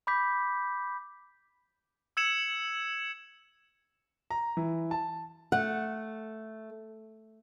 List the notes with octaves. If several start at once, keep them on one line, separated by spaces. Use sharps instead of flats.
B5 D6 G6 B6
E6 G#6 C#7 E7 F#7
A#5
E3
A5
A3 F#5